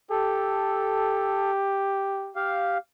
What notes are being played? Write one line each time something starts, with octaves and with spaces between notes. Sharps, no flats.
G4 A4
G4 F5